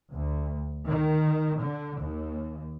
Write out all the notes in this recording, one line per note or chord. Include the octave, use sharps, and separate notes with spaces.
D2
D#3
D3
D#2